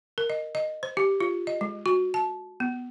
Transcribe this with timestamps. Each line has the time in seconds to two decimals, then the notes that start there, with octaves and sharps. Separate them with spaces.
0.18 A#4
0.30 D#5
0.55 D#5
0.83 C5
0.97 G4
1.20 F4
1.47 D#5
1.61 G#3
1.86 F#4
2.14 A5
2.60 B3